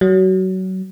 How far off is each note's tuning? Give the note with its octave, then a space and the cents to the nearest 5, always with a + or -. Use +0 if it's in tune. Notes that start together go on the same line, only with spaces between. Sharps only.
F#3 +25